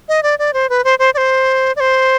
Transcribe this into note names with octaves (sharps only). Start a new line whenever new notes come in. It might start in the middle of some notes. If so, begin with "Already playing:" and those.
D#5
D5
D5
C5
B4
C5
C5
D5
C5
D5
C5